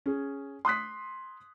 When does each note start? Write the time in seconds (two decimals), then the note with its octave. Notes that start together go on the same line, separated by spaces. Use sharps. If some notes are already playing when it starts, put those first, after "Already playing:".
0.06 C#4 G#4
0.65 C6 D#6 F#6 B6